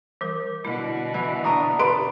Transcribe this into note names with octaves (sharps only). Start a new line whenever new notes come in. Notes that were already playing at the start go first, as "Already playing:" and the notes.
E3 G3 A#4
B2 D3 E4
E3
D4 A#5 C#6 D#6
B4 C6 D7